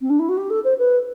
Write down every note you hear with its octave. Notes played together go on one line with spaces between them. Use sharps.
C4
D4
E4
F#4
G4
A4
C5
B4